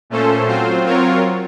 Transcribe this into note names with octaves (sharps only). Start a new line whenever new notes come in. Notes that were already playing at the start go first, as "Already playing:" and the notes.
A#2 A3 C#4 A4 C5
F#3 C4 F4 C5
F#3 C4 F4 A#4 C#5